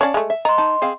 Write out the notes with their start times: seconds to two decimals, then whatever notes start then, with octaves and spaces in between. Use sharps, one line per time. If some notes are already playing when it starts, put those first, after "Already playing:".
0.01 C#4 C#5 D5 F5 A5
0.14 G#3 A3
0.30 E5
0.45 D#5 A#5 C6
0.58 D#4 A5
0.82 C4 G#4 F5